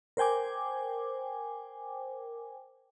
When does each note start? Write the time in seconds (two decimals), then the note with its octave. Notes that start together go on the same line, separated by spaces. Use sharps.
0.17 A#4 C5 G5 G#5 D6